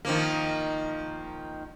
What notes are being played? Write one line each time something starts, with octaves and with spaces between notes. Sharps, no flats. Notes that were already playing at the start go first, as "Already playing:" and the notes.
D#3 F3 A#3